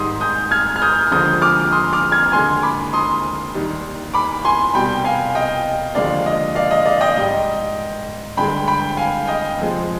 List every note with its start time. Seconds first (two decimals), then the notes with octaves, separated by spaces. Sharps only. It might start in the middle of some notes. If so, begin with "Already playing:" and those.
Already playing: G#2 D#3 G3 C6 D#6
0.21 D#6 G6
0.51 F6 G#6
0.76 F6
0.82 D#6 G6
1.11 D#2 D3 F3 G#3 D#6 G6
1.41 D6 F6
1.72 C6 D#6
1.93 D6 F6
2.12 F6 G#6
2.32 D#2 D3 G#3 G#5 C6
2.62 B5 D6
2.93 C6 D#6
3.54 D#2 D#3 G3
4.14 B5 D6
4.45 G#5 C6
4.74 C2 B2 G3 G5 B5
5.04 F5 G#5
5.35 D#5 G5
5.95 D#2 D3 F3 G#3 D5 F5
6.26 D#5
6.55 D5 F5
6.71 D#5
6.85 D5 F5
7.01 D#5 G5
7.16 G#2 G3
8.37 G2 D3 G#3 G5 B5
8.68 G5 B5
8.97 F5 G#5
9.27 D#5 G5
9.58 F2 C3 F3 G#3